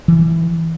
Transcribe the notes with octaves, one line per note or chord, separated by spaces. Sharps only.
E3